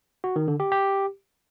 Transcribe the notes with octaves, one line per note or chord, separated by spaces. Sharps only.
F#4
D#3
D3
G4
G4